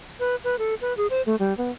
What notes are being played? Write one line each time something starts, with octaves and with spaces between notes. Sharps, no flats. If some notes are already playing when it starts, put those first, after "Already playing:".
B4
B4
A4
B4
G#4
C5
A3
G3
B3